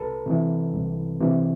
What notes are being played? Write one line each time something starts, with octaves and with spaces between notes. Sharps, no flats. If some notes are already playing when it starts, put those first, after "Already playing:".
Already playing: C2 A4 B4
C3 E3
C2
C3 E3